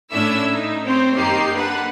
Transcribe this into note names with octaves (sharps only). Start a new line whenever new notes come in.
A2 C#4 D4 E4 E5 E6
D#4
C4 C5 C#5
F#2 D#3 A#3 D#4 G4 C7
D3 B4 F#5